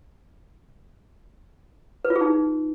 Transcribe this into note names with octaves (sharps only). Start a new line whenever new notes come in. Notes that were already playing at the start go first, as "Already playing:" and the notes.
B4
F4
G#4
D#4